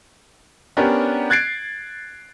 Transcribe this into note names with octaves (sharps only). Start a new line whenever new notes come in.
B3 C#4 D4 G4 A#4
F#6 G#6 A6 C7 D7